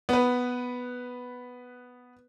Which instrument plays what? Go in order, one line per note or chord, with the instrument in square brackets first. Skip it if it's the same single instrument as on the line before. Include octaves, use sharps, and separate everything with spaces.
[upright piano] B3 B4